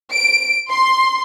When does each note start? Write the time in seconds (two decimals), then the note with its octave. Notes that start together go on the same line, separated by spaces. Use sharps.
0.12 D7
0.70 C6